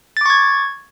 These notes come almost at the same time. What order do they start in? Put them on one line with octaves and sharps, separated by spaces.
A6 D6 C#6 G#6